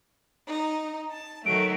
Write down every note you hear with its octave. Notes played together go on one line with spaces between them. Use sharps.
D#4
A5
D#3 F#3 A3 D7